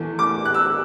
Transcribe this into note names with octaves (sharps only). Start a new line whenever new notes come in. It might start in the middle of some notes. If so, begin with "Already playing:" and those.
Already playing: E2 E3 A3
D6
F#6
E6